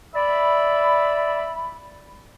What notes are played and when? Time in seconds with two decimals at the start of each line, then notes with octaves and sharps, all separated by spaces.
0.15 D5 E5 B5